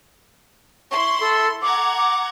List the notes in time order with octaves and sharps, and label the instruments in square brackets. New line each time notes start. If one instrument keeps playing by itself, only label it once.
[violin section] E4 C6 [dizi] C#6
[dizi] A4
[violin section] F#5 A#5 G#6 [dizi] D6
[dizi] D6